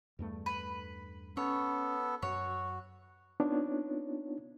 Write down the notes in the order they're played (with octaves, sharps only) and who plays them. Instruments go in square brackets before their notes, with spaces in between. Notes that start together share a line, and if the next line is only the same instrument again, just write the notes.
[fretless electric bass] E2 G2 A3
[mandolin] B4
[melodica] B3 A4 [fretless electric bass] C#4 [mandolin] C#5
[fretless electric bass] F#2 [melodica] F#4 [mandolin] C#5
[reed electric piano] B3 C4 D4 D#4 F4 C#5